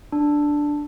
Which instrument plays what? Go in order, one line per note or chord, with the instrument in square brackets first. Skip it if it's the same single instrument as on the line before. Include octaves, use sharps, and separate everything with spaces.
[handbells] D4